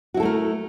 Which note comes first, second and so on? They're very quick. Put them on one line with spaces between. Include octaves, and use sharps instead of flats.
F#4 E4 A4 A3 A#4